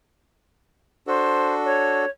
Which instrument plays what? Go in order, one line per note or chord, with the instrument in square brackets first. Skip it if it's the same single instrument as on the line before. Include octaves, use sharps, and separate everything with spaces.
[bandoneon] D4 F#4 A4 [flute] C5
[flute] C#5